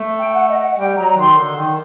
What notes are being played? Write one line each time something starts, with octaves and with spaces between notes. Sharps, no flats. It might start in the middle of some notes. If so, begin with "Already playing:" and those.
Already playing: A3
G5
F#5
D#5
F#5
G3 G5
F#3 A#5
D#3 C6
D3
D#3